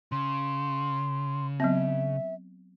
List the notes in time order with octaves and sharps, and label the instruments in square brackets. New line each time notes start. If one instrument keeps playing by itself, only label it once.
[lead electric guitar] C#3 [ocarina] C6
[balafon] F#3 B3 C4 [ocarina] E5